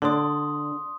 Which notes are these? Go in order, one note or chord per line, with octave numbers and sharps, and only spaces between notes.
D3 D4 D5 C6 D#6